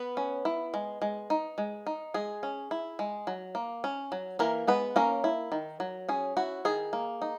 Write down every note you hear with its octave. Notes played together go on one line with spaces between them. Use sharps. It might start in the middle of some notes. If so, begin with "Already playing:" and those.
Already playing: B3 B4
C#4
E4
G#3
G#3
D#4
G#3
D#4
G#3 G#4
C#4
E4
G#3
F#3
A#3
C#4
F#3
E3 A#3 A#4
G#3 B3 B4
A#3 C#4 A#4
E4
D#3
F#3
C#4 G#4
E4 F#4
D#3 G#4
A#3
D#4